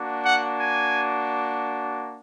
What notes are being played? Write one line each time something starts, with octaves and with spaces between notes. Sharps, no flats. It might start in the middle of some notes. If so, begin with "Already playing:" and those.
Already playing: A#3 D4 F#4
F#5
G#5